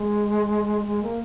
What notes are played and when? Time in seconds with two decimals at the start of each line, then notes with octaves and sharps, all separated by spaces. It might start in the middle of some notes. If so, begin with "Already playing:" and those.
Already playing: G#3
0.87 G#3
1.03 A#3